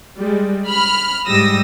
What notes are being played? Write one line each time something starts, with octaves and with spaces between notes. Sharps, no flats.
G3 G#3
B5 F6
G#2 G3 D#6 E6 A#6